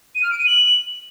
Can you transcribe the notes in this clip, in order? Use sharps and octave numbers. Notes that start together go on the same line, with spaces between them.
D#7
F6
D7
D#7
F#7